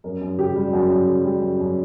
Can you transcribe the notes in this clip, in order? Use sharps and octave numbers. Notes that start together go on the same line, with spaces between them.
F#2 A#4
F#2
C#3 G4
G3
F#2 F#4
F#2
C#3
G3
F#2
F#2